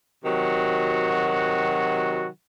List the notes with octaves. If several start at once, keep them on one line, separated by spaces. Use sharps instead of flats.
C3 D#3 F#3 F#4